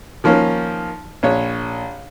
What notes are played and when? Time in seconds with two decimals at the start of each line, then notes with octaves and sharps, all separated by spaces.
0.24 D#3 F3 A#3 C#4
1.23 A#1 C#5